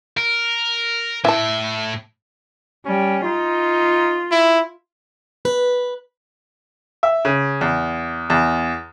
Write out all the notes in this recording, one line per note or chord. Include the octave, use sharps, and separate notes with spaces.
A#4
A2 E4 E5 A5
G3 C#4
D#4 F4
E4
B4
E5
C#3
E2
E2